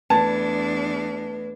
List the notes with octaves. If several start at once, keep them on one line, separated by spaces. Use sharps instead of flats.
E2 A3 D4 B4 A5 G#6